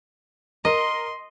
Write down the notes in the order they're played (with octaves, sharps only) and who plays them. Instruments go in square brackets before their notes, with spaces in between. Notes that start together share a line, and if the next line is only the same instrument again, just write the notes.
[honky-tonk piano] A#4 [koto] D#5 [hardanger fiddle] C6